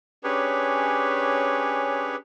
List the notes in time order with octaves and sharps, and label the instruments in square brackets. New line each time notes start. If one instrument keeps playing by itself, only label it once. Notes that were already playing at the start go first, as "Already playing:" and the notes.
[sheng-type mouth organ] C#4 D4 G4 G#4 B4 C#5